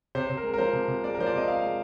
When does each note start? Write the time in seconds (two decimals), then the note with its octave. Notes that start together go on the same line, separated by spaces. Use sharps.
0.15 C3 C5
0.27 C3 C5
0.37 A#4
0.43 G#3
0.53 A#4
0.58 F3 C5
0.73 C3
0.88 C3
1.04 G#3 D5
1.15 A#4
1.19 F3 C5
1.26 D5
1.34 C3 D#5
1.48 C3 F5
1.62 G#3